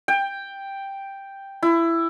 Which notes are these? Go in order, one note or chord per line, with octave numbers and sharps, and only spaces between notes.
G5
E4